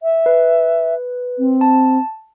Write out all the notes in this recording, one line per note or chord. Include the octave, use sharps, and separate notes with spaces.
E5
B4
C4
A5